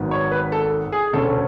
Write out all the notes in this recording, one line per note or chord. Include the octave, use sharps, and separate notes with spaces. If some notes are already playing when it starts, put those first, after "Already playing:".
Already playing: G#1 G#2 F#3 B3
C#5
B4
A4
G#4
E1 D2 D3 A3 C#4 A4